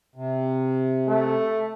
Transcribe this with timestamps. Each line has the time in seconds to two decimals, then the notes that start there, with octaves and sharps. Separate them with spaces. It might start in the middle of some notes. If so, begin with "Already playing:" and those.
0.16 C3
1.08 A3